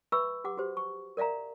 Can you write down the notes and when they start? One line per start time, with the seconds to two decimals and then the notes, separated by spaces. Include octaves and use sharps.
0.12 B4 E5 B5 C#6 E6
0.44 G4 F#5 D6
0.57 F#4 G4 C5
0.77 C#6
1.17 A#4 D5 E5 F5 A#5